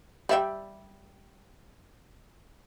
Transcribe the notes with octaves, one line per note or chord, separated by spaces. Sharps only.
G3 E5 G5